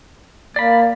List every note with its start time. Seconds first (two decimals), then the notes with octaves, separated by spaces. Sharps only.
0.56 A#3 D5 B5